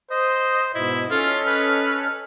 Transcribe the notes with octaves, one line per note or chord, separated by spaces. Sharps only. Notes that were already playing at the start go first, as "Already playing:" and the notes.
C5 D#5 D#6
G#2 B2 E4 D#5
C#4 F4 A4 F6
B4